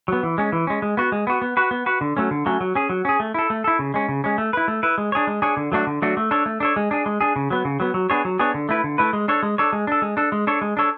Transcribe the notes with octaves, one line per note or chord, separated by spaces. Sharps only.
F#3 B3
E3
G#3 C#4
E3
G#3 C#4
G#3
B3 F#4
G#3
B3 F#4
B3
F#4 B4
B3
F#4 B4
D3
F#3 A3 C#4
D3
F#3 A3 C#4
F#3
C#4 G#4
F#3
C#4 G#4
A3
E4 A4
A3
E4 A4
C#3
G#3 C#4
C#3
G#3 C#4
A3
E4 B4
A3
E4 B4
G#3
D4 G#4 C#5
G#3
D4 G#4 C#5
D3
F#3 A3 D4 F#4
D3
F#3 A3 D4 F#4
A3
D4 A4 C#5
A3
D4 A4 C#5
G#3
D4 G#4
G#3
D4 G#4
C#3
F#3 B3
C#3
F#3 B3
F#3
B3 D4 G#4 C#5
F#3
B3 D4 G#4 C#5
D3
A3 E4 B4
D3
A3 E4 B4
G#3
D4 A4 C#5
G#3
D4 A4 C#5
G#3
D4 A4
G#3
D4 A4
G#3
D4 A4 C#5
G#3
D4 A4 C#5